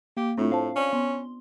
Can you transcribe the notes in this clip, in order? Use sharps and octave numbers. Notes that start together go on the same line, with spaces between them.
A#3 G4
A2 A3 C4 D4 F4
C5 F5 A5
C#4 D5
B3 C6